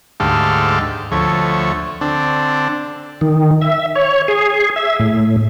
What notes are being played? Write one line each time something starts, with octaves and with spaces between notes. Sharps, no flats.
D2 G#2 G4 A4 F5
D2 F3 A3 C#5
D3 C4 D4
D#3
E5
C#5
G#4
E5
A2